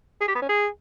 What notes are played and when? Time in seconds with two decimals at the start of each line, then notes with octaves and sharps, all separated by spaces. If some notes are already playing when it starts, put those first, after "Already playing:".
0.21 G#4
0.28 G4
0.35 B3
0.42 C#4
0.49 G#4